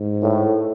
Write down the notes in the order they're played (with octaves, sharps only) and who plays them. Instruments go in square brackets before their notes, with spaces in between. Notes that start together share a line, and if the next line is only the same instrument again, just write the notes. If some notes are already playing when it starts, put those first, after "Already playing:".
Already playing: [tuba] G#2
[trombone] A2